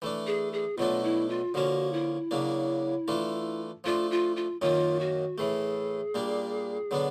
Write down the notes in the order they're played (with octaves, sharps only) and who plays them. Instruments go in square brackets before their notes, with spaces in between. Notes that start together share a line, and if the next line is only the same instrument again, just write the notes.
[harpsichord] E3 A3 D4
[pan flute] G#4
G#4
[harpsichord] B2 F#3 A3 D4 [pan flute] F4
[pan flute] E4
F4
[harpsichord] D3 F3 A#3 C#4 [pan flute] F#4
[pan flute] E4
[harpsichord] C#3 F#3 A#3 D4
E3 A3 D4 F4
[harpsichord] F3 A3 D4 [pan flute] F4
[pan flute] F4
F4
[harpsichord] F#2 D#3 F#3 A#3 [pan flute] F4
[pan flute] F#4
[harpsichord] A2 E3 A3 [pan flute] G#4
[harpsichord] A#2 G3 A#3 D4
D3 F#3 B3 D4